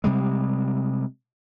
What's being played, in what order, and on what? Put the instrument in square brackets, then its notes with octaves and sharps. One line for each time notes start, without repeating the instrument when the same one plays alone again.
[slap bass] C3 G3 G#3